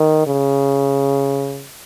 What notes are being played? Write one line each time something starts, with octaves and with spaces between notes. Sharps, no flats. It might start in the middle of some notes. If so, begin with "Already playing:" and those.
Already playing: D#3
C#3